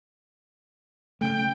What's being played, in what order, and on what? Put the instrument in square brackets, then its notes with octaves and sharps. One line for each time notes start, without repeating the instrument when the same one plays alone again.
[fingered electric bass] C#3 A3 [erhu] G5